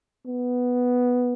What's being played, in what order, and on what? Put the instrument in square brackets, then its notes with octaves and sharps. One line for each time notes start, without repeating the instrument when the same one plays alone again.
[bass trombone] B3